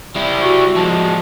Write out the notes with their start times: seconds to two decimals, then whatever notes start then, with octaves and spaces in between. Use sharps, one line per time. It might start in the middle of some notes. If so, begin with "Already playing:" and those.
0.16 G3 E4
0.42 F#4 C#6
0.76 F3 G#3 A5